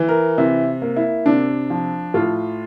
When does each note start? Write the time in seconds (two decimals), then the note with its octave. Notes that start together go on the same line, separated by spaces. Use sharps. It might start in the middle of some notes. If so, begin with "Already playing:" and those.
Already playing: E3
0.09 A#4
0.38 C3 E4
0.82 A#3
0.96 E4
1.26 C3 D4
1.70 F3
2.14 A2 F4